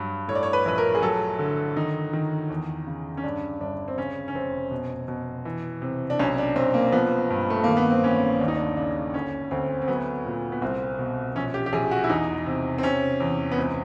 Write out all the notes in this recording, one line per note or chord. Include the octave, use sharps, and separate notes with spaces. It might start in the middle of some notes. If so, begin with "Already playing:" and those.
Already playing: G2 F#3
A2 C#5
D5
C#5
B4
A#1 B4
A#4
G#4
F#3 A4
D3
D#3 D#4
D#3
E2
C#3
C#4
G2 D4
G1 D4
C4
C#3 C#4
C#4
F1 C4
B2
B2
E3
C3
D4
B1 C#4
D4
B1 C4
A#3
F3 B3
G2
A3
D#3 A#3
B3
C4
A1 C#4
D#2 D4
D#4
D4
C#3 D4
D2 C#4
D2 C4
C4
F#3 B3
A#2
B3
C2 C4
B2
A#1 C#4
G4
G4
A#1 G#4
F#4
E4
E2 D#4
C3
C4
C3 C#4
E2
B3
C#2 C4